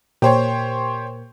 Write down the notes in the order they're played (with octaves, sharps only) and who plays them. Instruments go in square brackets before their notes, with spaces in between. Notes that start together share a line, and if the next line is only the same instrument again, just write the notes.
[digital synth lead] A#2 [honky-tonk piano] G4 C5 C#5